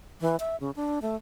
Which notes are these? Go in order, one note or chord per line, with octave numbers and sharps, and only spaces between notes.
E3
E5
C#3
D4
A3